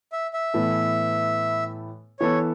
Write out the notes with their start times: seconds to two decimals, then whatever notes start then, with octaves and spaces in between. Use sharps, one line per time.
0.12 E5
0.33 E5
0.54 A2 E3 B3 A4
2.19 E3 B3 A4 C#5